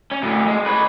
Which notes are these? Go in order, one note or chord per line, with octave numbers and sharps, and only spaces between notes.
C#4
D2 A2
G#3
B4 C#5